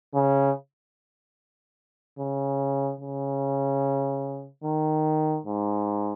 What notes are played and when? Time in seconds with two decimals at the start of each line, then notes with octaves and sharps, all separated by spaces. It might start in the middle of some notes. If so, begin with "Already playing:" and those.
0.14 C#3
2.19 C#3
3.01 C#3
4.64 D#3
5.46 G#2